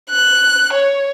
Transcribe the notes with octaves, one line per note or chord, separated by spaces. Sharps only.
F#6
C#5